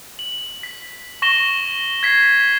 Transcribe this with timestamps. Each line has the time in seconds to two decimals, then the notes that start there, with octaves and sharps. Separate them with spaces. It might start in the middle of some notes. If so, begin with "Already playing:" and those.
0.19 F#7
0.63 B6
1.22 C#6 A#6 E7 G7
2.03 G#6 B6 C7